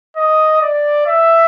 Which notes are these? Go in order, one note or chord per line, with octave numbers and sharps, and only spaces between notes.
D#5
D5
E5